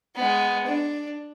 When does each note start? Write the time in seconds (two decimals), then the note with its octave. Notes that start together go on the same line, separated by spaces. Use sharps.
0.15 G#3 B3
0.66 D4